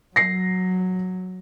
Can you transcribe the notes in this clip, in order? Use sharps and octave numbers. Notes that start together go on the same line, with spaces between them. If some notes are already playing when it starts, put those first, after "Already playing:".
F#3 A#6 C7